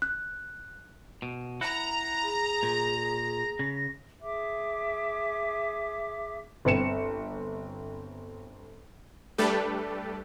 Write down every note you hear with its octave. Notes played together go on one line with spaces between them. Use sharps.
F#6
B2
E4 F#5 A#5 A#6
G#4
A#2
C#3
G#4 E5 D6
G1 C4 B4 C#7 E7
G3 A3 D4 G4 A4 B4